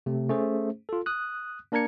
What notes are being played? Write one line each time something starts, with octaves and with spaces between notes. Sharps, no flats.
C3 A3
A3 C#4 G#4 C5
F4 A4
D#6 F#6
A#3 D4 A#4 A#5 G#6 C#7